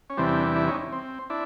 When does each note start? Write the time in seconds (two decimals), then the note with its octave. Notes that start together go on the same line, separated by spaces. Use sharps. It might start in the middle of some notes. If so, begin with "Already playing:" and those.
0.10 C#4
0.17 E2 C3 E3 G3 C4 D4
0.54 D4 E4
0.67 C#4 D#4
0.92 C4
1.30 D4 E4